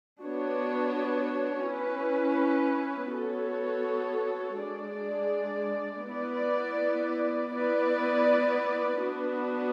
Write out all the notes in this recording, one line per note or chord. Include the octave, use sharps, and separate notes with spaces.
B3 D4 F#4 C#5
C#4 E4 B4
B3 F#4 A4 C#5
G#3 D4 G#4 D5
B3 E4 B4 D5
B3 E4 B4 D5
B3 D4 F#4 B4